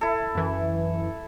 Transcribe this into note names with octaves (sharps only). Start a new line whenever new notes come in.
E4 A4
F#2 E3